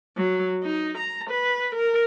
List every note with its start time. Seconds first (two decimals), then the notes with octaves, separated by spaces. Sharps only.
0.17 F#3
0.63 D#4
0.98 A#5
1.30 B4
1.75 A#4